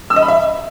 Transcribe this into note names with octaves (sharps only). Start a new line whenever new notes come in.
E6
D#5
B5
E5